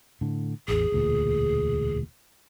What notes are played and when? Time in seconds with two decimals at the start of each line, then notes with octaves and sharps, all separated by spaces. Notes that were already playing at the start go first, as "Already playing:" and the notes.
0.21 A2 D3
0.68 A1 E2 G#4
0.92 E1 D2 A#2